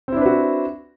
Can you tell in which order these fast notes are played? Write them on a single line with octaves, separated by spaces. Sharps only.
C4 E4 D4 B4 F#4